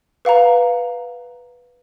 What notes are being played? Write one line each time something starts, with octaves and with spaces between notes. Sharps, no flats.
B4 F5 F#5 A#5